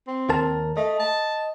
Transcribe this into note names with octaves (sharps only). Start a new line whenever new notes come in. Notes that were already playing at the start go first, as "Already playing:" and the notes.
C4
D#2 A#4 A5
A3 D#5
A5